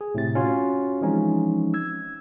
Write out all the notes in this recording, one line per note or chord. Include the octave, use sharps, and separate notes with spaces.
G#4
A2 C3 A6
C#4 F4 F#4 C#5
E3 F3 G#3 C4 C#4 D#4
E6 G#6